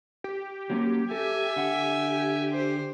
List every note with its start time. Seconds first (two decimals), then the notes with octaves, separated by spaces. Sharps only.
0.24 G4
0.70 F#3 A#3 C#4
1.11 A4 E5 G#5
1.56 D3 F#5
2.53 C5